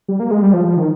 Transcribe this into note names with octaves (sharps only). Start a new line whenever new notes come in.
G3
A#3
G#3
G3
F3
F3
D#3